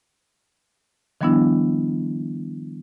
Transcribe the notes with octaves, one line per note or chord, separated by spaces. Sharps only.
D#3 F3 G3 B3 D4 E4